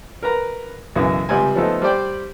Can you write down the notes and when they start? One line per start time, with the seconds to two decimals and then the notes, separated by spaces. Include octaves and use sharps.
0.23 A#4 B4 A#5
0.96 B1 F#2 C#3 E3
1.29 C#2 C3 G3 G#5
1.56 F3 A3 B3 D#4 A4
1.82 G3 C5 D5 G5